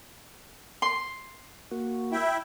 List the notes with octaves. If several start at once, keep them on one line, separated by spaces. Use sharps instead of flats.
C6
A#3 F#4
E4 E5 G5